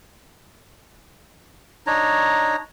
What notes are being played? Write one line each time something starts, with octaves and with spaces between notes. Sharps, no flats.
D4 D#4 C#5 A#5